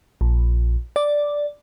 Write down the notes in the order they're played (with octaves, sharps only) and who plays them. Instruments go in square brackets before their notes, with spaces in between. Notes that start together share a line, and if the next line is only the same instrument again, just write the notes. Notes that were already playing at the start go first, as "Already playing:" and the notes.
[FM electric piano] A#1
D5